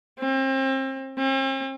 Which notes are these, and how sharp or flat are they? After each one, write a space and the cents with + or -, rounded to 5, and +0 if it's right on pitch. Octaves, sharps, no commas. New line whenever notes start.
C4 +35
C4 +45